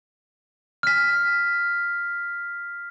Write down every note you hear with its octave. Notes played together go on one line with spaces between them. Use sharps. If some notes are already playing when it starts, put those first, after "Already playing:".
F6 B6